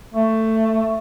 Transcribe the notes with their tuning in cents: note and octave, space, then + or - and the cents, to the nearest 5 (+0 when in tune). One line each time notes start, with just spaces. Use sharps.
A3 +15